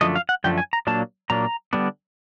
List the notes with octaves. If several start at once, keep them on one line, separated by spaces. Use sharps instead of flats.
F#2 D3 F3 A3 D#5
F5
F#5
F#2 D3 F3 A3 G5
G#5
A#5
A#2 F#3 A#3 D4 A5
A#2 F#3 A#3 D4 A#5
D3 G3 B3 D4